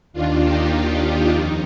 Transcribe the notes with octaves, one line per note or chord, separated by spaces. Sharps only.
D#2 D#3 D4 F4
D#4 G4
D4 F4
D#4
F2 D#3 D#4